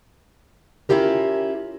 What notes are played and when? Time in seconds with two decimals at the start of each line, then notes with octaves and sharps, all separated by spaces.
0.89 C#4 E4 F4 G4 A#4